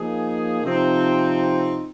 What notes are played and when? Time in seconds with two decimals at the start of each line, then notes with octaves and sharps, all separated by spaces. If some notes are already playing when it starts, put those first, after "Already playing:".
Already playing: F3 A#3 D#4 G#4
0.62 C3 F3 C4 D#4